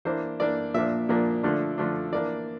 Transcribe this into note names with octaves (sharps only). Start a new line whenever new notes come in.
E3 A#3 D4 C5
E3 A#3 D4 D5
A#2 F3 A#3 D4 E5
A#2 F3 A#3 D4
D3 F3 A3 D4
D3 F3 A3 D4
E3 A#3 D4 D5